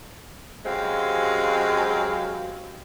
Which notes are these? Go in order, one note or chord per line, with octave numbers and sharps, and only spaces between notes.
F#2 F#3 G#3 C4 G4 F5